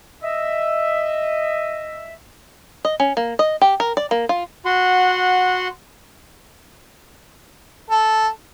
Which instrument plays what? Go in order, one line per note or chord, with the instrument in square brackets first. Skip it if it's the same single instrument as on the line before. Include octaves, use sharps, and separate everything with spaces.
[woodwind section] D#5 E5
[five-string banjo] D#5
C#4
A#3
D#5
G4
A#4
D5
A#3
F4
[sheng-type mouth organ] F#4 F#5 C6
[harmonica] A4